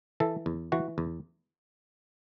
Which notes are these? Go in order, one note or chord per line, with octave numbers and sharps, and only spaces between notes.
E3 A4
E2
E3 F#4
E2